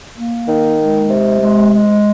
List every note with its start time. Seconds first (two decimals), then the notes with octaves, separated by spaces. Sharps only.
0.15 A#3
0.47 D#3
0.78 G#3
1.09 C3
1.41 G#3
1.73 G#3